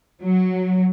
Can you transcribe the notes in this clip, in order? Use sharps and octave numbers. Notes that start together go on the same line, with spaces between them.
F#3